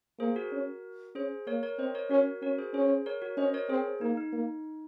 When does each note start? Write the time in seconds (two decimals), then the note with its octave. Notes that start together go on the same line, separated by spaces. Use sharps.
0.20 A#3 G#4 C5
0.36 F#4 A#4
0.52 C#4
1.15 C#4 G#4 C5
1.47 A#3 A#4 C#5
1.63 A#4 C#5
1.79 C4 C5 D#5
1.95 A#4 C#5
2.10 C#4 F#4 A#4
2.42 C#4 F#4 A#4
2.58 G#4 C5
2.74 C#4 G#4 C5
3.06 A#4 C#5
3.22 F#4 A#4
3.37 C#4 C5 D#5
3.54 A#4 C#5
3.70 C4 G#4 C5
4.01 A#3 D#4
4.17 D#4
4.33 A#3